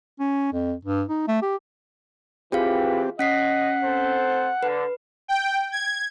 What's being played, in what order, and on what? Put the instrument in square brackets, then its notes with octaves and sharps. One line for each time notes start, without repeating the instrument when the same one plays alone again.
[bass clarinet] C#4
F2
G2
D#4
A3
G4
[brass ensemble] E3 [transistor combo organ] C4 G4 [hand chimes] F4 G#4 F5
[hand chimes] C#4 B6 C7 [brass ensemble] D#5 [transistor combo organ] F#5
[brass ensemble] C4 A4 C5
[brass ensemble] D3 [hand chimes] B4
[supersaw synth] G5
G#6